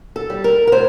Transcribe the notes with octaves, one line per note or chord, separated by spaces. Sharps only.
A4
G3
A#4
A#4
A2 C5